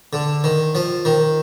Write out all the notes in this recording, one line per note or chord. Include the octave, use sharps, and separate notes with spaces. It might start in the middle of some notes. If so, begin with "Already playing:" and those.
D3
D#3
F3
D#3